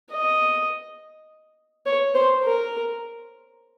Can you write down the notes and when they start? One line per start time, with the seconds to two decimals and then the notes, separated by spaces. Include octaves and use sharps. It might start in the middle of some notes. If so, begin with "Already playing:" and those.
0.11 D#5
1.86 C#5
2.15 C5
2.44 A#4